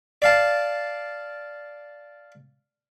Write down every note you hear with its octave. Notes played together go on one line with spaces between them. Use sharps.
D5 F5 A5